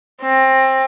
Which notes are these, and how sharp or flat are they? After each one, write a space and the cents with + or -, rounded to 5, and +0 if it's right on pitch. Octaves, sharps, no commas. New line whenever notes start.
C4 +20